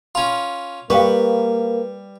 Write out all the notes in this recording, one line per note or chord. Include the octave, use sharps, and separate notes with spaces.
C#4 F4 B5
G3 A#3 B4 F5 G5 C#6